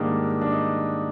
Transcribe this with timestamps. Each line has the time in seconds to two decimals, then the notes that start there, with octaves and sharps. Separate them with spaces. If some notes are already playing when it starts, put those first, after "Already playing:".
Already playing: G#2 D#3 G3 A#3 D4 D#4
0.42 D4
0.52 D#4